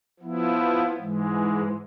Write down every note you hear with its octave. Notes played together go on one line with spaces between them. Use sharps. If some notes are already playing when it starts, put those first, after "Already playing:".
F3 B3 E4
G#2 E3 G#3